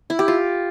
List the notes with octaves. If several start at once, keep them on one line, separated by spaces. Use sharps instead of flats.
E4
G4
F4